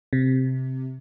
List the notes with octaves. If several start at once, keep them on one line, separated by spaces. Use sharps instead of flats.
C3